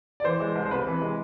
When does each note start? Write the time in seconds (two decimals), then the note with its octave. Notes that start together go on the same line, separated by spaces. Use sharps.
0.20 D5
0.24 E3 C5
0.40 G#3
0.55 C2
0.66 C5
0.71 C3 B4
0.86 E3
1.01 G#3